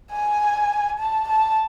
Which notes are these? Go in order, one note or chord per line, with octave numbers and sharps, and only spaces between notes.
G#5
A5
A5